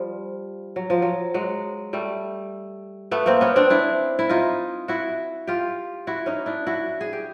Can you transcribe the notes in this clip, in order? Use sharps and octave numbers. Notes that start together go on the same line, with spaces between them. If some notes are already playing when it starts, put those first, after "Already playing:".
Already playing: F3 G3
F#3
F3
F#3
F#3 G#3
G3 A3
A3 B3
A#3 C4
B3 C#4
C4 D4
D4 E4
E4
D#4 F4
E4 F#4
F4 G4
E4 F#4
C#4 D#4
D4 E4
E4 F#4
G#4
G4